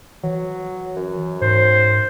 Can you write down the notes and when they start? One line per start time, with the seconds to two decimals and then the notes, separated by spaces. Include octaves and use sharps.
0.23 E3 F#3
0.96 F#2
1.42 G#2 C5